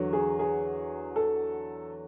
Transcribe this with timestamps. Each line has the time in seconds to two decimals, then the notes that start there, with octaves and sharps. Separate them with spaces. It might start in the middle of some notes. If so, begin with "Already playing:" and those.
Already playing: E2 D3 F#3
0.13 G#4
0.39 G#4
1.16 A4